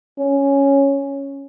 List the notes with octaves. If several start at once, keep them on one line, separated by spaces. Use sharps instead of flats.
C#4